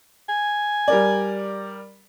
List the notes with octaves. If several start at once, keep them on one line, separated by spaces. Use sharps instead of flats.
G#5
G3 A#4 D5